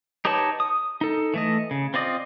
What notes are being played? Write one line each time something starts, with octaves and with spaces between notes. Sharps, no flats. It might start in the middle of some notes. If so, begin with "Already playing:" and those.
D#4 G4 B4 C#5 A5
D#6
D#4 A4
E3 A3 D#5
C#3
C4 F4 D5 D#5